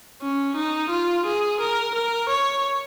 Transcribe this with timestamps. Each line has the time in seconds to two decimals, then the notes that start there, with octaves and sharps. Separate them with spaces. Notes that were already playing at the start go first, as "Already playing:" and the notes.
0.23 C#4
0.56 D#4
0.91 F4
1.26 G#4
1.61 A#4
1.95 A#4
2.29 C#5